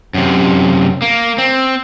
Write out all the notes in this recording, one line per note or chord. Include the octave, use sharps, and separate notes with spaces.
F#2 C3
A#3
C4